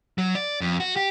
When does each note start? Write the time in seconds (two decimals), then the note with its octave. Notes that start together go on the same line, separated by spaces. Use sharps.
0.18 F#3
0.35 D5
0.61 F2
0.80 F#4
0.96 G4